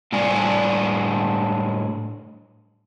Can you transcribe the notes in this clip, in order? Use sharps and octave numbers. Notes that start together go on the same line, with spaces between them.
A2 G3 D4 D5 F5 G#5